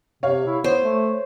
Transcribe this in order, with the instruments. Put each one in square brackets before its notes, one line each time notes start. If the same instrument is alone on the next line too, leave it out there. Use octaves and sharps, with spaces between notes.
[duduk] C3 [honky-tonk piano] C#5 F5
[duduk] E4
[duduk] B3 [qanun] C5 [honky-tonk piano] C#5
[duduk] A3